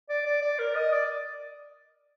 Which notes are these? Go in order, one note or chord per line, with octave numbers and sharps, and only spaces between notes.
D5
D5
D5
A#4
D#5
D5